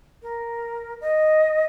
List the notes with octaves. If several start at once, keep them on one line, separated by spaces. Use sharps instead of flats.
A#4
D#5